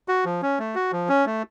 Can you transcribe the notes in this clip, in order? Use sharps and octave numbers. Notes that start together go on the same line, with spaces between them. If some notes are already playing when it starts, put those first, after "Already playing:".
F#4
F3
C#4
A3
F#4
F3
C#4
A3